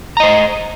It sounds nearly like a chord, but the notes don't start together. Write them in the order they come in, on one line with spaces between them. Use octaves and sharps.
A#5 D#5 C5